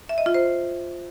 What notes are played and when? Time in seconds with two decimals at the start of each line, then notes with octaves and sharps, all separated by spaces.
0.09 E5
0.18 D#5
0.26 F4
0.34 C5